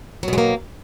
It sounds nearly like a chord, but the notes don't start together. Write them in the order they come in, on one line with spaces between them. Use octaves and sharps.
F#3 B2 G#3 A#3